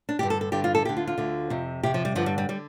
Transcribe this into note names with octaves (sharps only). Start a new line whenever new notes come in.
D4
G2 D3 G4
A4
A4
G2 D3 G4
F4
A4
D2 D3 G4
F4
F4
D2 D3
F2 C3
F2 C3 G4
F3
G3
G2 D3 F3
G3
G3
D3 G3